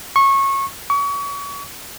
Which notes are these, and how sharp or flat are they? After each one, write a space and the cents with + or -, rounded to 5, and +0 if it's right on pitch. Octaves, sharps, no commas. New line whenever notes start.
C#6 -20
C#6 +35